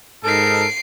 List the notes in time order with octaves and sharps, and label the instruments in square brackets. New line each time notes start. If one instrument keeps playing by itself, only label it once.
[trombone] G#2 [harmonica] D#4 A4 A#4 [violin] C7 D7